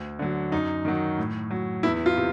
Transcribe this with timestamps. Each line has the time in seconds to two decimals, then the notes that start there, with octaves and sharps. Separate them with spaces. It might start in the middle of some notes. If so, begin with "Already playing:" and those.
Already playing: D2
0.19 D3 F#3
0.52 F#2 D#4
0.85 D#3 F#3
1.18 A2
1.51 F#3
1.83 E2 E4
2.06 F4
2.17 C3